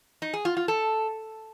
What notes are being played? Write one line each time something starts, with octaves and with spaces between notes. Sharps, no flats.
D#4
G#4
F4
F4
A4